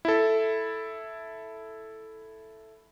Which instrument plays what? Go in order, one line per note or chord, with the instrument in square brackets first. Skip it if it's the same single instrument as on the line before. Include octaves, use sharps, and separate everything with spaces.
[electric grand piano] E4 A4